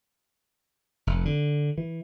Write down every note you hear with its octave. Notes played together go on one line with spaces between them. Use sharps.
F1
D3
E3